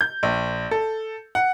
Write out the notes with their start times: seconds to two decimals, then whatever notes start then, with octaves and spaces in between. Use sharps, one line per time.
0.01 G6
0.23 A#1
0.71 A4
1.35 F#5